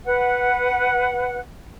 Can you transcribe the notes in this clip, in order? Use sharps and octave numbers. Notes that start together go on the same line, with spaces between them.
B4 F#5